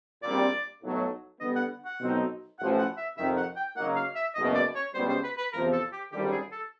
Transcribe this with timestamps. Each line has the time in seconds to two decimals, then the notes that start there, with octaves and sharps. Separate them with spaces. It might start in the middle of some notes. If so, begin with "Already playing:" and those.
0.23 A#1 A#2 G3 C4 D5
0.82 B1 A2 F#3 A3
1.40 D3 G3 B3 D#5
1.55 F#5
1.85 F#5
1.99 B2 F#3 A3 C4 D#4
2.58 A1 A2 F3 F#5
2.78 F#5
2.97 E5
3.17 F2 C3 D#3 E5
3.37 F#5
3.56 G5
3.76 C#3 F#3 A#3 D#4 F#5
3.96 F5
4.15 E5
4.35 F#1 E2 B2 D#5
4.55 D5
4.75 C#5
4.94 C#2 B2 G3 B3 C5
5.09 C5
5.24 B4
5.38 B4
5.53 E2 C3 F3 A#4
5.73 A4
5.92 G4
6.11 G#1 F#2 D3 G3 G4
6.32 G#4
6.52 A4